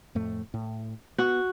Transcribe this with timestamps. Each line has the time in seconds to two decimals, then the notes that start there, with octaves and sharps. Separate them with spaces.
0.15 F2 A2 A3
0.54 A2
1.18 B3 F#4